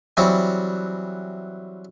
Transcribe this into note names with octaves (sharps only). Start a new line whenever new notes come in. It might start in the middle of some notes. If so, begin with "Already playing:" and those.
E3 F#3 G3 C4 F#4